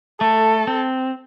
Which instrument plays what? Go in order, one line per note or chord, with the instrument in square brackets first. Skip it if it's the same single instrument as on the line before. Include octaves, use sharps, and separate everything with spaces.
[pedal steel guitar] A3 [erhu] A4
[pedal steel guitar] C4